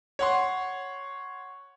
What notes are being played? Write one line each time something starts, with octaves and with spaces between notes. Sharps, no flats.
C#5 F#5 C6